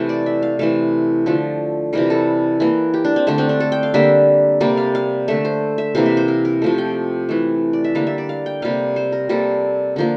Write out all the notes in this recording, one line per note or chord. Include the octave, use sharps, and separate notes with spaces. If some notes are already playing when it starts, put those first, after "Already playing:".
Already playing: C3 E3 A3
D5
E5
F5
C3 E3 A3 F5
D3 F3 A3
C3 E3 G3 A#4
A4
E3 A#3
G4
D4
C4
D3 A3 D4
C4
D4
A4
G5
F5
D3 G3 A#3 E5
C3 G3 A#3 D5
F5
F5
D3 A3 E5
C5
E5
C3 E3 A#3 F5
E5
C5
A#4
A#4
C3 F3 A3
G5
E3 A3
D5
E5
D3 G3 A#3 F5
E5
D5
F5
G5
C3 G3 A#3 F5
C5
A#4
C3 G3 A#3 A4
D3 F3 A#3